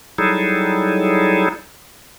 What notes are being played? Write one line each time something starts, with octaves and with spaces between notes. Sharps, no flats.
F#3 G3 D#4 E4 G#4 A4